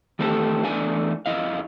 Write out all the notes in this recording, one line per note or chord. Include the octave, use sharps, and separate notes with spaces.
E2 D#3 A3 C4 G4 A4
E2 E3 A3 D4 G#5
F2 E4 D#5 F5